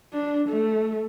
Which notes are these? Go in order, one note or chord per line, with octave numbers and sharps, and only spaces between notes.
D4
A3